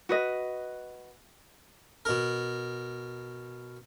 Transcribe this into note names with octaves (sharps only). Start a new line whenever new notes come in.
F#4 B4 D#5
B2 A#4